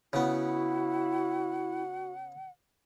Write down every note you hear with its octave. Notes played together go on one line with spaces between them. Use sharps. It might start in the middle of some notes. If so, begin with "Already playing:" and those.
C#3 B3 E4 F#4 F#5